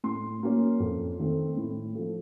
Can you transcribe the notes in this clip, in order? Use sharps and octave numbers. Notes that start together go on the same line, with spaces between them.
A2 C6
F#3 A#3 C#4
F2
D#3 A3 C4
A2
F3 A3